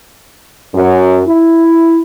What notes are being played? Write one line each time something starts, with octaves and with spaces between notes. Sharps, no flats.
F#2
E4